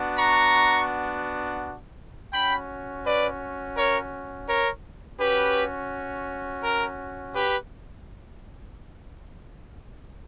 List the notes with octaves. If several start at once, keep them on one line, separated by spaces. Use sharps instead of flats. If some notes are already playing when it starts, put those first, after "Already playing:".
Already playing: B3 D4 F#4
A#5 C#6
C#4 F#4 G5 B5
B4 D5
A#4 C#5
A#4 C#5
C#4 F#4 G4 B4
A#4
G4 B4